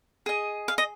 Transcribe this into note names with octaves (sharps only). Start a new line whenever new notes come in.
G#4 D#5
F5
D#5